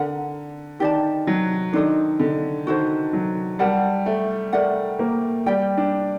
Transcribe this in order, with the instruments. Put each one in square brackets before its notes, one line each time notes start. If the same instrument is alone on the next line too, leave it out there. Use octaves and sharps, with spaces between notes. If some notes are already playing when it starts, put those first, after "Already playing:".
Already playing: [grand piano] D3 [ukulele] A#4 D5 F#5 A#5
[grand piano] D#3 [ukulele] G4 D5 A5
[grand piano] F#3
[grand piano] D#3 [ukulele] D4 A4 C5 D#5
[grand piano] D3
[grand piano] D#3 [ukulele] F#4 A4 C5
[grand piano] F#3
[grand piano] G3 [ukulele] A#4 F#5 A5
[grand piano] A3
[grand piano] A3 [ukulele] A#4 D5 F#5
[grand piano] A#3
[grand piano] G3 [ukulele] G4 D5 G5
[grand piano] D4